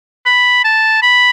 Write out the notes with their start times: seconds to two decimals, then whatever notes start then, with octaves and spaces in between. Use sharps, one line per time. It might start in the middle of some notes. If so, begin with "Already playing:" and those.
0.26 B5
0.64 A5
1.02 B5